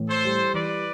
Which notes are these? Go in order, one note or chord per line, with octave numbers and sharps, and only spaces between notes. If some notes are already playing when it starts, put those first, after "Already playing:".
Already playing: A2 E3
A4 C5
G3
E3 B4 D5